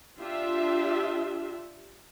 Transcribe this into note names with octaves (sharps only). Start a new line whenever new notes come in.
D4 F4 G4 E5